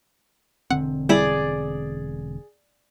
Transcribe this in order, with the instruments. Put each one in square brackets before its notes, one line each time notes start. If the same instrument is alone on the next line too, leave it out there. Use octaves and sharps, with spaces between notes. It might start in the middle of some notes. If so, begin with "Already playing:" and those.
[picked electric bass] E1 D3 C4 [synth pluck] F#5
[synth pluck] G3 E4 [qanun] G#4 D5